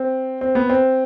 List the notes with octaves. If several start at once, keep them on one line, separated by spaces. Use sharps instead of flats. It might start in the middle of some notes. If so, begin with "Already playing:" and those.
Already playing: C4
C4
B3
C4